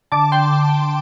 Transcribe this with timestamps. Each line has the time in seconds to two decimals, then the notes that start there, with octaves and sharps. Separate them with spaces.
0.12 D3 A5 D6
0.32 G5 C6